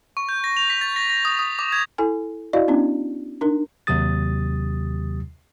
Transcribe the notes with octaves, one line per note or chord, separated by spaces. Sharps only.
C#6
G6
A#6
F7
B6
A6
A#6
A#6
D#6
D#6
D6
G#6
E4 A4 G#5
E4 F#4 D5 D#5 F5
B3 C#4 D4 E4
D4 D#4 A#4
D#2 C3 F#3 G4 D#6 A6